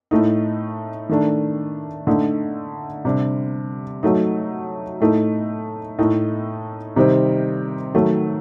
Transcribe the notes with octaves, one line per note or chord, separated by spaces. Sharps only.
A2 A3 D#4
D#3 A3 D4
D3 A3 D#4
C3 G3 D4
F#3 A3 D#4
A2 A3 D#4
A2 A3 D#4
C3 D#3 G3 C4 D#4
D#3 F#3 A3